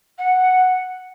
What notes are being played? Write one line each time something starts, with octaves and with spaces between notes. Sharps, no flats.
F#5